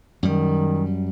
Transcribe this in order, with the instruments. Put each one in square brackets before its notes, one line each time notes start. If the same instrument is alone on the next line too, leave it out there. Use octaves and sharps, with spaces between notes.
[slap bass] F#2 G3 [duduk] D#3